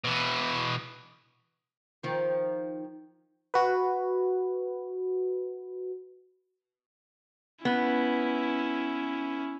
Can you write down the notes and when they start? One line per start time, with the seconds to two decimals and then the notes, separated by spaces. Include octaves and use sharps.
0.04 B2 E3
2.03 D#3 F3
3.54 F#4 B4
7.65 B3 C#4 E4